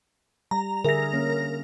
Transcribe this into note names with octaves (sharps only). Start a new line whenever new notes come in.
G3 A#5
D3 G#4 A#4 E5 A#6
D3 A#3 C#4